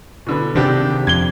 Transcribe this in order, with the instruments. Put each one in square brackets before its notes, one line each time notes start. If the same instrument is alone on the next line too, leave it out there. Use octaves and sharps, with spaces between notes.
[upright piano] B2 D3 B4
[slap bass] C3 D#3 [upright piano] C4 D4 G4
[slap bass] F2 [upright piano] G#6 G7